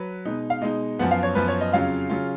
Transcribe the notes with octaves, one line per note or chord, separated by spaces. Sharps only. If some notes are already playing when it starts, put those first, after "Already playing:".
Already playing: F#3 B4
B2 G#3 D#4
F5
B2 G#3 D#4 D#5
F#2 F3 B3 F#5
F5
C#5
F#2 F3 B3 B4
C#5
D#5
F2 C#3 F#3 C#4 F4 F5
C#3 F#3 C#4 F4